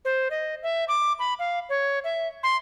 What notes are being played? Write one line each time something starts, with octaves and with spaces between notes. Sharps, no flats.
C5
D#5
E5
D6
B5
F5
C#5
E5
C6